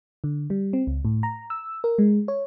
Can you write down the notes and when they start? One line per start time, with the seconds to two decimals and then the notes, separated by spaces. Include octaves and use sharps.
0.24 D3
0.50 G3
0.73 C4
0.87 C#2
1.05 A2
1.23 A#5
1.50 E6
1.84 A#4
1.98 G#3
2.28 C#5